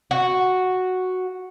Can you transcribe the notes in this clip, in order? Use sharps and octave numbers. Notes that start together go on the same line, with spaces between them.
F#4